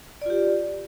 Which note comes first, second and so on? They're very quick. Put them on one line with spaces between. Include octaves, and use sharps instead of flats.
D5 F4 G4